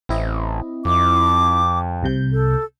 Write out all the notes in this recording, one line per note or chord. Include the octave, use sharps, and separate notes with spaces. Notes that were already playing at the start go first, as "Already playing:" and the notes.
A1 C4 E4 D#5
F2 D6
C2 C3 G6
A4